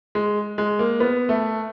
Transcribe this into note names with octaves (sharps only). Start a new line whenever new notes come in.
G#3
G#3
A#3
B3
A3